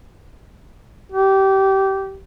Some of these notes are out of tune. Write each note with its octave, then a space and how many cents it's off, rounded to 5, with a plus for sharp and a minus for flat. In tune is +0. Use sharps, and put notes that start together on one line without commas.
G4 -20